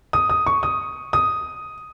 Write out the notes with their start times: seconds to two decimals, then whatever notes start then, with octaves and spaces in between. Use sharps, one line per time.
0.13 D#6
0.30 D#6
0.46 C#6
0.63 D#6
1.13 D#6